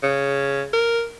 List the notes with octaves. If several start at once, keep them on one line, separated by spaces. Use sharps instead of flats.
C#3
A#4